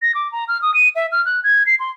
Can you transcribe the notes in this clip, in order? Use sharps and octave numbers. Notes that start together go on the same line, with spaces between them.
A#6
D6
A#5
F6
D#6
D#7
E5
F6
F#6
G#6
C7
C6